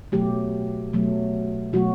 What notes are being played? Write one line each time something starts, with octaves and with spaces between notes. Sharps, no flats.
B2 F#3 A3 G4
B2 F#3 A3
B2 F#3 A3 F#4